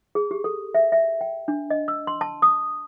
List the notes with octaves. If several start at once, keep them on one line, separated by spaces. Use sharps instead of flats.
G#4
G4
A4
E5
E5
G5
D4
D#5
E6
C6
A5
D#6